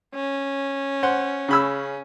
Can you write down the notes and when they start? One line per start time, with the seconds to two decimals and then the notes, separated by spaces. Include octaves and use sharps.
0.15 C#4
1.03 C5 F#5
1.48 C#3 B5 E6